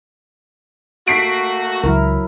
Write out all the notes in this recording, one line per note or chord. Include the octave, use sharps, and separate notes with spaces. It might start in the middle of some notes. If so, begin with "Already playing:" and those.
A3 A#3 F#4 B6 C7 D7
C#2 F#3 E4 A#4